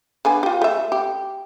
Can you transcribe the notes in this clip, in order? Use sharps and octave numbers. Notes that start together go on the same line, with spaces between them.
D3 B3 G#5
F4 G4
A3 E5
G4